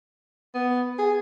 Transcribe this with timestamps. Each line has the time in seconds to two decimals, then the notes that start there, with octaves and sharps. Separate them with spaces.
0.55 B3
0.98 G#4